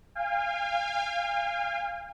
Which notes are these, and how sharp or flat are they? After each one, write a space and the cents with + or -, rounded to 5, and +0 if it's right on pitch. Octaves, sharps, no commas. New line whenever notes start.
F5 -10 G#5 -45